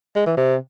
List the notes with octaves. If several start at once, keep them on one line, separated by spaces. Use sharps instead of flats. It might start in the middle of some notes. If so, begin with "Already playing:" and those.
G#3
E3
C3